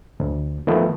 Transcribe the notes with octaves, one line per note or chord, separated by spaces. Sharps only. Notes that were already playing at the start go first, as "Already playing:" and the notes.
D2
D#3 F3 A3 B3